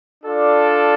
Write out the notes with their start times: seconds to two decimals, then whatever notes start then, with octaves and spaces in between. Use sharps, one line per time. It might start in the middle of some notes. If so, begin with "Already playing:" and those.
0.23 D4 F4 A4 D5